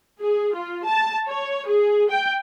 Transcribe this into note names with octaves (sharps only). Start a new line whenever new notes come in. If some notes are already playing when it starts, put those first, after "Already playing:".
G#4
F4
A5
C#5
G#4
G5